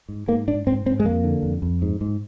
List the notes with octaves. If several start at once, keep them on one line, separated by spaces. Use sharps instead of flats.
G#2
G#2 A#3
G#2 D4
G#2 C4
G#2 C4
G#3
F2 A#3
D3
F2
F2
G#2
G#2